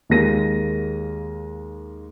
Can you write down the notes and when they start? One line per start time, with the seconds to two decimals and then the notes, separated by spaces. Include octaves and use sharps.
0.09 D#2 G#3 A#3 A#6 D#7